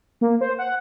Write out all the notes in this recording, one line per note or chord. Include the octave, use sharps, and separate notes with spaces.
A#3
C5
F#5